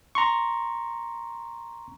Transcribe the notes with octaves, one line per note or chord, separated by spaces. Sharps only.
A#5 C6 C#6